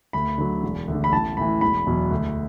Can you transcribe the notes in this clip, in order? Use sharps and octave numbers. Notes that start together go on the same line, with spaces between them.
D2 B5
D3 F#3
E1
D2 D3
B5
A1 A5
A2 E3 B5
E1 B5
E2 B2 F#3
D2